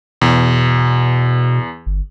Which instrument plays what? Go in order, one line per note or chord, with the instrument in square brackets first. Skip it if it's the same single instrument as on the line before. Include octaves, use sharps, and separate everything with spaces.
[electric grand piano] E2 [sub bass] B2
[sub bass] G1